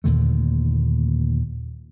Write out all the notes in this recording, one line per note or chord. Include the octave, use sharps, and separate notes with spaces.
D#2 A#2 D3 A3